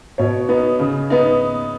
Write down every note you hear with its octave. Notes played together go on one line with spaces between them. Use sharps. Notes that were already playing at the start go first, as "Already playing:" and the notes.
B2 C#5
B3 D#4
C#3
B3 D#4